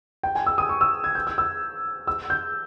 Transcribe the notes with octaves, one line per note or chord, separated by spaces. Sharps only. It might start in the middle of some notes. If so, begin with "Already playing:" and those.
G5
G#5
E6
D#6
C#6
E6
G#6
G6
E6
E6
E6
G6